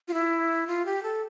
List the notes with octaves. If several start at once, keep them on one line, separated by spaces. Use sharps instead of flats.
F4
E4
F4
G4
A4